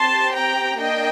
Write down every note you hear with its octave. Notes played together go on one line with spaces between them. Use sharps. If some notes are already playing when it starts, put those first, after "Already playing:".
Already playing: C4 G4 A5 C6
G5 A#5
A#3 D4 D#5 G5